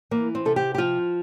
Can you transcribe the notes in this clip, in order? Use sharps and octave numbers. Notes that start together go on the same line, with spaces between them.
E3 A#3
C4
C3 A4
G4
G4
F3 F4